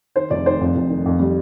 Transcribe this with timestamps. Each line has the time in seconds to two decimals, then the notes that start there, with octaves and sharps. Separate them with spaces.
0.15 D#3 C5
0.30 F1 D5
0.46 D#3 C5
0.61 F2
0.76 F1
0.90 D#3
1.06 F2
1.20 G3